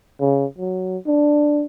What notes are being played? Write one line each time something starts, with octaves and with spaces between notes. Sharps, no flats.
C#3
F#3
D4